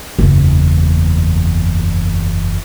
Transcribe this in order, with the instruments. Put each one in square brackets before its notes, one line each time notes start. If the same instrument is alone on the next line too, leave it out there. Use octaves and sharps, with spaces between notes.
[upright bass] F#1 E2